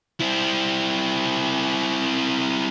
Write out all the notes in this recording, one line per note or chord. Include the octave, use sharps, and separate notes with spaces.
C4 E4